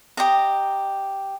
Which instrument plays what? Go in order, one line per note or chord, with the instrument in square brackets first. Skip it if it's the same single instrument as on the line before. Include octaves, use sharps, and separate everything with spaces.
[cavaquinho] G4 D#5 A#5